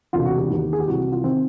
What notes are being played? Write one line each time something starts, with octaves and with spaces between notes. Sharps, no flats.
E1 D2 C3 F4
F#4
G4
D#2 D#3
G#4
G4
C2 C3 E3 F#4
F#4
F4
D#3 C4